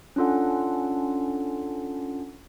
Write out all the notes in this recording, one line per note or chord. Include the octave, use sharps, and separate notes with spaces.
C#4 D4 F4 A4 F#5